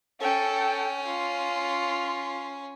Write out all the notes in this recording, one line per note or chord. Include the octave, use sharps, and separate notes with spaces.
C#4 A4 G5
F4 C6